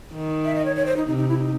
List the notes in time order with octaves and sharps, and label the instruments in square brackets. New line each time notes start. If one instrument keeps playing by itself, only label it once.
[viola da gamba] D#3
[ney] E5
D#5
C#5
C#5
C5
D#4
[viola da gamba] C3 [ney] D#4
[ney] D#4
E4
D#4